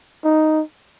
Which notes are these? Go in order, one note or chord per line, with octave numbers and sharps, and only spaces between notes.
D#4